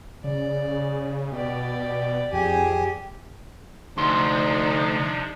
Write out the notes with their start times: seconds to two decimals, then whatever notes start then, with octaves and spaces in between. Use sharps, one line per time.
0.24 C#3 D5
1.32 B2 G4 D5
2.33 F2 G4 G#4 G#5
3.98 D2 C3 F3 D4 D#4 D5 C6